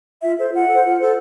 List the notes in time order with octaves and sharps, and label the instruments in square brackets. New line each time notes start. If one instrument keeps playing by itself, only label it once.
[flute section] F4 E5
A4 C5
F4 F#5
A4 C5
F4
A4 C5